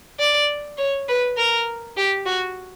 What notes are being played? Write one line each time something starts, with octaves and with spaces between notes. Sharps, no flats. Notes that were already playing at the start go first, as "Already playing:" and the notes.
D5
C#5
B4
A#4
G4
F#4